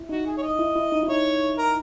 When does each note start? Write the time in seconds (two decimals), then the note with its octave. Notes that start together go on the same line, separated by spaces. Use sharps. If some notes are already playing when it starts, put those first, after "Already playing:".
Already playing: E4
0.09 D#4 F#4
0.26 G#4
0.38 C#5
0.43 D#5
0.59 E4
0.75 E4
0.92 D#4
1.03 E4
1.08 D#4 C#5
1.58 A#4